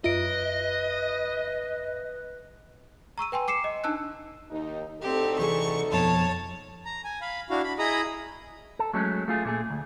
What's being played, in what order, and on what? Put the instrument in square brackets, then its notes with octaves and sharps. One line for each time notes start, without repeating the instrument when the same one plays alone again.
[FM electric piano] F#2 E5 [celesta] F4 D7 [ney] B4 [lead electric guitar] D#5
[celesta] A#5 C#6 E6 D#7
B4 G5 G#5 C6
D6 C7 C#7 E7
D#5
D4 D#4 A5 E6 F#6
[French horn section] D#2 D#4
[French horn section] D2 D#4 A4 [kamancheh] C4 G4
[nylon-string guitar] C3 E3 G#4 [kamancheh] C#6
[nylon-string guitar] F2 B2 F3 [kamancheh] C#5 A5
[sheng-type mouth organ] A#5
G#5
F5 B5
D4 E4 F#4 F5
B5
E4 G#4 D#5 A#5 B5 D#6
[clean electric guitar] A4
F#3 G#3 A3 C#4
A3 F4 G#4
A#2 A3 G#4
D2